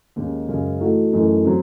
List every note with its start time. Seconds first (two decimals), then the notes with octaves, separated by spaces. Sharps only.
0.16 D#2 D#3 G#3 C#4
0.48 F#2 C#3 G#3 C#4
0.81 E3 A3 D#4 F#4
1.13 F#2 E3 A3 D#4
1.45 F#3 C4